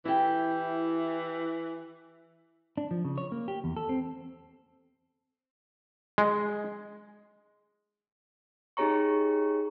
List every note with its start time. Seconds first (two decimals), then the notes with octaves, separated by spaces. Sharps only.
0.05 E3 E4 G4
2.77 D4
2.91 F3
3.05 C#3
3.18 C#5
3.32 A#3
3.48 G4
3.64 E2
3.77 A4
3.89 C4
6.18 G#3
8.77 D#4 G4 G#4 C#5 A#5 C#6